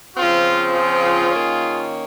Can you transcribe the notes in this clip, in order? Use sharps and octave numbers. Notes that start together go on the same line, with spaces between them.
C#3 F3 C4 F4
F4 G#4
D#3 A#3 C#4